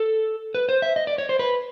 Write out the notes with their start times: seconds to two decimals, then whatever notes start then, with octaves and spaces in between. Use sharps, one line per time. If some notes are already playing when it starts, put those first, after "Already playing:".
Already playing: A4
0.55 B4
0.69 C5
0.82 E5
0.96 D#5
1.07 D5
1.18 C#5
1.29 C5
1.39 B4